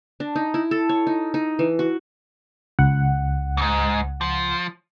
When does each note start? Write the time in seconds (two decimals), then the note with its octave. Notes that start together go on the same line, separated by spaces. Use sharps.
0.20 D4
0.35 D#4
0.54 E4
0.71 A4
0.89 C#5
1.07 D#4
1.34 D#4
1.59 E3
1.79 F#4
2.79 C#2 F#5
3.57 F2 G#2
4.21 F3